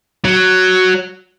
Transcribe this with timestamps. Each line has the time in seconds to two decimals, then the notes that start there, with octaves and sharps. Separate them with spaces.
0.25 F#3